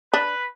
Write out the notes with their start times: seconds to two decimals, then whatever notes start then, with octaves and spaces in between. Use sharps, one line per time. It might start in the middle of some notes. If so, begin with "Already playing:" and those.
0.13 D4 B4